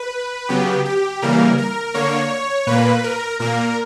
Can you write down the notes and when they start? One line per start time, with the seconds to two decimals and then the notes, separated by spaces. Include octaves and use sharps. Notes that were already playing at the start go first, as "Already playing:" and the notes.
Already playing: B4
0.49 C#3 F#3 B3 G4
0.85 G4
1.22 C#3 E3 G3 A#3 A#4
1.58 A#4
1.94 D3 A#3 C#5
2.67 A#2 A#3 B4
3.04 A#4
3.40 A#2 A#3 A#4